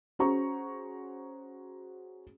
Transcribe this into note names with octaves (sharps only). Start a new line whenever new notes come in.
C#4 F#4 G#4 C5 A#5 C#6